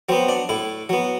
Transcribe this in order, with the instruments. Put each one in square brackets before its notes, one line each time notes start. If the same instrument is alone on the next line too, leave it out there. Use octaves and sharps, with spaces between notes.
[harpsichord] F#3 B3 C4
D4
A2 E4
F#3 B3